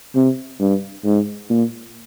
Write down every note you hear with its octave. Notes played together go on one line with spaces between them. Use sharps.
C3
G2
G#2
A#2